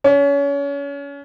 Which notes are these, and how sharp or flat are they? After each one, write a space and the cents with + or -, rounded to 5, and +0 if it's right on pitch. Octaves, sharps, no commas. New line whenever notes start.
C#4 +30